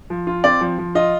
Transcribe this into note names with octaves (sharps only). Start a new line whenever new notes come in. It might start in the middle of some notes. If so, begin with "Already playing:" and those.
F3
F4
C4 D5
F3
F3
F4 D#5